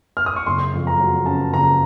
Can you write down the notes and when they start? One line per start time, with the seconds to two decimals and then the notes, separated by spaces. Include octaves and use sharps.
0.17 F6
0.26 D#6
0.36 C#6
0.46 F#1 C6
0.73 F2
0.87 A#5
1.00 F#3
1.26 C#3 A5
1.53 F#1 A#5